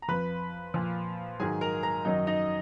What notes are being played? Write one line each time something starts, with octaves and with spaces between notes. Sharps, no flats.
A#5
F2 F3 B4 B5
A#2 F3
G#2 D#3 F#3 G#4 G#5
A#4 A#5
A#4 A#5
F#2 D#3 F#3 D#4 D#5
D#4 D#5